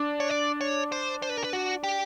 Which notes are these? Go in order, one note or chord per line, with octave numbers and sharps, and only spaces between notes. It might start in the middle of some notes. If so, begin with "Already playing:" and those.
Already playing: D4
C#5
D5
C#5
C5
C5
B4
A#4
B4
F#4
G4